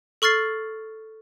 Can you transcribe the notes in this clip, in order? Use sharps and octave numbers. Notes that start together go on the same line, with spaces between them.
A4 C#6 F6 A6 C7